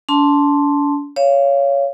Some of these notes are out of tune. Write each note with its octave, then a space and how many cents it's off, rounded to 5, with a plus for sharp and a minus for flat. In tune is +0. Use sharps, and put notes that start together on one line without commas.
D4 -45 A5 +0 C6 +0
C#5 +10 F5 -20